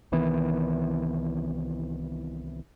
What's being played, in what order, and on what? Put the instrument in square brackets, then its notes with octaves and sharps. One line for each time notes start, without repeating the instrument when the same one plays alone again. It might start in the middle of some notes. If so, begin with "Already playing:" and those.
[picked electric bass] C2 D#3 E3 B3